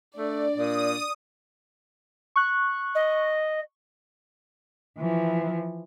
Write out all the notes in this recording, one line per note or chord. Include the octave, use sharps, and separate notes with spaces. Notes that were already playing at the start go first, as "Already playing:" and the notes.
A3 D4 D5
A#2 D#6
C#6 F#6
D#5
E3 F3